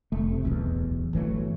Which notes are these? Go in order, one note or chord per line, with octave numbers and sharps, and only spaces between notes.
F1 A3
C3
D1 B1 E2
G1 E3 F#3 A3